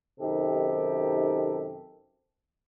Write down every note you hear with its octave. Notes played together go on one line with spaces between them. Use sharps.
F#2 C3 D#3 D#4 G4 A4